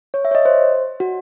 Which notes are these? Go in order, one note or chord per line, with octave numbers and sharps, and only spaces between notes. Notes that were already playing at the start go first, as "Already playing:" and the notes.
C#5
E5
C#5
D#5
C5
F#4